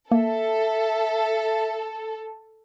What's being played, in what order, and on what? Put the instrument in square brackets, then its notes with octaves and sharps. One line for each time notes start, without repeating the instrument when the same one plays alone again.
[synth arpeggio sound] A#3 [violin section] A4 [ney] E5